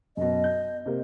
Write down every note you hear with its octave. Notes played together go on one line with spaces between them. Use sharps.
F#2 B2 D#5
G6
C3 A#3